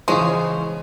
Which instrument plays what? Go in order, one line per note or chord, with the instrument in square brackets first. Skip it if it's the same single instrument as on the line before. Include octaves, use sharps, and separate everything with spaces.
[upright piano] C#3 E3 [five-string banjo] F3 C#4 C5 [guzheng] G#3